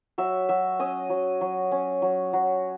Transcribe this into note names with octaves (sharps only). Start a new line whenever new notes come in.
F#3 E5
F#3 E5
C#4 D#5
F#3
F#3
C#4
F#3
F#3